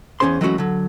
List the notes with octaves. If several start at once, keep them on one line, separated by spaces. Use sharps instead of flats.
E2 D#3 C#4 G#4 C5 C6
E3 F#3 G#3 A3 C#4 F#4
D3 F#3